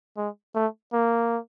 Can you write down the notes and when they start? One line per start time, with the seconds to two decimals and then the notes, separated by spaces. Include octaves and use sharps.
0.17 G#3
0.55 A3
0.93 A#3